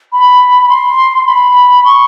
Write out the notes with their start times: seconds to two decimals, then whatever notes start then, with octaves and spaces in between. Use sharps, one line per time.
0.13 B5
0.69 C6
1.26 B5
1.84 C#6